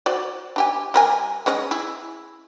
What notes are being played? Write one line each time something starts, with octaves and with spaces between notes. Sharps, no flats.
F#4 C5 D5
D4 G4 G#5
G3 A#4 G#5
G#3 C#4 D#5
E4 G#4